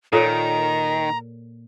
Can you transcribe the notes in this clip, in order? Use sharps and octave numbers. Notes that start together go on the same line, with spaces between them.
A#2 D#3 A4 C#5 D5 A#5